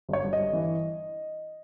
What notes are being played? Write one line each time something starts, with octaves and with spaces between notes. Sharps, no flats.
G1 C#5
G1
D#5
G2
E3